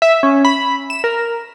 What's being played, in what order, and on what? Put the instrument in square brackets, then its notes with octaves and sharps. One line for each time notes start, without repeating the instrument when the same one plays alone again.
[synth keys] E5
C#4
B5
E7
A#4